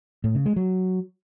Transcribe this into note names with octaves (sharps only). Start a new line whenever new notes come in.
A2
C#3
G#3
F#3